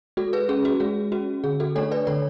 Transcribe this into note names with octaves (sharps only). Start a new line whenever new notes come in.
G#3 F#4 A4
G#4 B4
C#4 G#4
F#4
G#3 G#4
C#4 F#4
D3 G#4
F#4 A4
A3 D4 A4 C#5
B4 D5
D3 A4 C#5